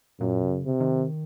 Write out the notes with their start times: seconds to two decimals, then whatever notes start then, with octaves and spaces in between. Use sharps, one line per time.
0.21 F#2 A#2
0.42 C3
0.50 C#3
0.65 C3
0.80 D#3